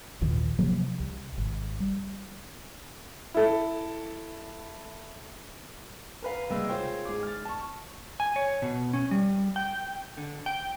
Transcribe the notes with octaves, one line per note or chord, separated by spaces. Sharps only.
G#1 D#2 A#2 E3
C3 F3 F#3 A#3
C2
G#1
G3
E4 A4
A#4 B4 F5
C2 G#3 A#3 E6
F4 G#4 C5 C#5 G5
G#2 G#4 D6
F6 A6
A5 C#6
G#5
C#5
B2
C#4
G3
G5
D3
G5